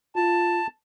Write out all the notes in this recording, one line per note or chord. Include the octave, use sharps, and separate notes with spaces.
F4 A5